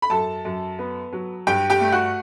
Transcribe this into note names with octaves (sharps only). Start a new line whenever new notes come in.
B5
F#2 A4 A5
F#2
B3
F#3
G2 G4 G5
G4 G5
A3
F#4 F#5